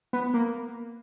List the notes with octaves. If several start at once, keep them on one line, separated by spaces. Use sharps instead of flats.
B3
A#3